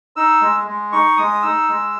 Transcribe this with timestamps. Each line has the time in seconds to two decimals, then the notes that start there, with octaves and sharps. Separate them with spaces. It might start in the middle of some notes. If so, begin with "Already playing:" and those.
0.16 D#4 E6
0.41 G#3
0.67 G#3
0.92 D#4 C#6
1.17 G#3 D#6
1.43 D#4 E6
1.69 G#3